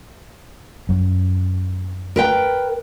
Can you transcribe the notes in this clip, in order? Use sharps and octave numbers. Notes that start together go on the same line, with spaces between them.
F#2
A#4 B4 G5